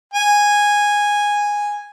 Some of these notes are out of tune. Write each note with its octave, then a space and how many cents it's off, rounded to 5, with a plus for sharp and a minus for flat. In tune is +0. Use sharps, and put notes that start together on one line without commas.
G#5 -10